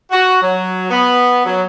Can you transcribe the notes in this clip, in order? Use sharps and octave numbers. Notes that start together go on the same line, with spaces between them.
F#4
F#3
B3
F#3